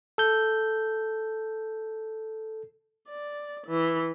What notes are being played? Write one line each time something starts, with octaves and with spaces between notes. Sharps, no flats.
A4 G6
D5
E3